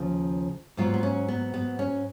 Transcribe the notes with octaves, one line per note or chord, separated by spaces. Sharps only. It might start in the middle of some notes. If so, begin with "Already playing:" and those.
Already playing: D#2 C#3 F3
G#2 F#3 B3 F4
B3
C#4
B3
B3
C#4